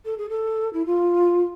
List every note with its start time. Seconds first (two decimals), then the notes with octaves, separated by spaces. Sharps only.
0.05 A4
0.18 G#4
0.29 A4
0.73 E4
0.86 F4